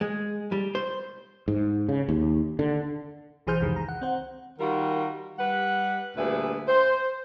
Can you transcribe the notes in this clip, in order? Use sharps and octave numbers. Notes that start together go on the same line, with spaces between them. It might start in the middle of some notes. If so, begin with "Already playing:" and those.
G#3
G3
C5
G#2
C#3
D#2
D3
B1 E3 G#4 C5 F6 G6
C2 F2 D#3 E3 G#3
A#5
F#5
C4 C5 F#5
D#3 G3 F4 F#4 A#4
G3 B4 F#5
D2 A#2 G3 G#4 B4 E5
C5